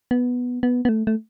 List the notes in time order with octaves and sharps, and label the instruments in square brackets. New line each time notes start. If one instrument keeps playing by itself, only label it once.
[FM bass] B3
B3
B3
A3
A3